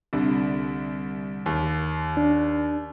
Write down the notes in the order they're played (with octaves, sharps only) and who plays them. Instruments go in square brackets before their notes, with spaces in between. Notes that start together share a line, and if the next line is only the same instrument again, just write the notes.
[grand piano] C2 D3
D#2
[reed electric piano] D4